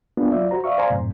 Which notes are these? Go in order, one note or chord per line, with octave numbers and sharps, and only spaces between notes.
A#3 B3 D4 F4
F#3 F4 D5 E5
F#4 C5 A#5
D5 E5 F5 C#6
C5 D5 F5 G#5 A#5 C6
F#2 A2 C3